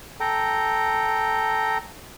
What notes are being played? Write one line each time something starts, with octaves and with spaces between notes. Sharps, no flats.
A4 G5 A#5